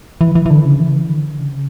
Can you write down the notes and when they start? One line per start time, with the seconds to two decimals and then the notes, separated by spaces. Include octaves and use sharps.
0.21 E3
0.35 E3
0.46 E3
0.50 D3
0.65 C#3
0.80 E3
1.09 D3
1.39 C#3